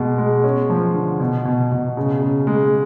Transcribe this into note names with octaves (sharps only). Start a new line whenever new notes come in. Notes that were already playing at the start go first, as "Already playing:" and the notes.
Already playing: B2 G#3
G#3
C#4
F3
D3
B2
B2
B2
C#3
C#3
G#3